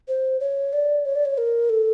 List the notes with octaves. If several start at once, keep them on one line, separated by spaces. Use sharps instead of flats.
C5
C#5
D5
C#5
D5
C#5
A#4
A4